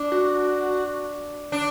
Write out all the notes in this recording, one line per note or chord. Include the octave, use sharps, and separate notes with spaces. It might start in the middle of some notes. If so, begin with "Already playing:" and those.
Already playing: D4
F#4
D4